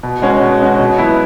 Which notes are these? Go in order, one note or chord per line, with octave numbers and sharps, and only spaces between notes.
B2
G#3 C#4 F#4
B2
G#3 C#4 F#4
B2
F#3 B3 E4